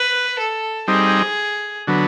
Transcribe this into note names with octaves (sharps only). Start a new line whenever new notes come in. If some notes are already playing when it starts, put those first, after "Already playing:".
Already playing: B4
A4
G3 C4 D#4 G#4
D3 F#3 B3